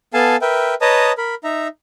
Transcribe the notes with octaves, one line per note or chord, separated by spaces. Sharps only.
B3 A4 F5 G#5 A5
A#4 B4 E5 G5
B4 C#5 D#5 A5 A#5 D#6
A#4 B5
D#4 E5 A#5